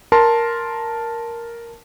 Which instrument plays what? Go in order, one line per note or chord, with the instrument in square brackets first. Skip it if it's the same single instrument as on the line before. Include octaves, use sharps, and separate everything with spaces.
[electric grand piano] A#4 A5 C6